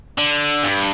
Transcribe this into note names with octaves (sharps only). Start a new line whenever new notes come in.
D3
G2